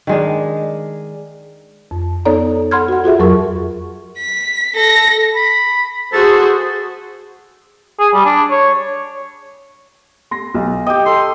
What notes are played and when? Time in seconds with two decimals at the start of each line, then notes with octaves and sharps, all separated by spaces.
0.07 D#3 G#3 D4
1.91 F2
2.25 B3 D#4 A4 C#5 D5 A#5
2.71 A4 F#5 B5 C6 F6 G#6
2.88 F#4 F#5
3.04 F4 F#4 G#4 E5
3.19 F2 F#3 G#4 A#4 C#6
4.18 B6
4.75 A4 A#6
5.36 B5
6.13 F#4 G#4 A4 C5
7.99 G#4
8.14 G3
8.26 D4
8.50 C#5
10.31 C6 A#6
10.55 B1
10.86 G4 D#5 G5
11.06 A4 C6